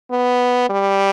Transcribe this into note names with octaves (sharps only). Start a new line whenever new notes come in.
B3
G3